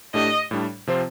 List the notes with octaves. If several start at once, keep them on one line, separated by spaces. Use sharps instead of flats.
A2 A3 D4 G4 D#5
A2 G3 D4
C3 F3 C4 F4 C5